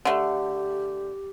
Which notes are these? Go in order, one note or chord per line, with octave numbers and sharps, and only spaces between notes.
D3 A3 G4